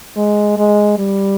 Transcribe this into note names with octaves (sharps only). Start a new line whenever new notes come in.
G#3
G#3
G3